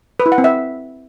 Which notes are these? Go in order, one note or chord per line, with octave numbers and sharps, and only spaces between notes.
B4
E4
F#5
C4
E5